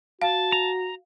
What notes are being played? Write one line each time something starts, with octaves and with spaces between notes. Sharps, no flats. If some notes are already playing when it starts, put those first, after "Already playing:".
F#4 F5 A5
A#5